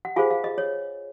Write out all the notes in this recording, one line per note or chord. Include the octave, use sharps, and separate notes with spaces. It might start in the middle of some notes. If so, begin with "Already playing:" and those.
F#5
F4 G#4 C5 F5 G#5
F5
D#5
C#5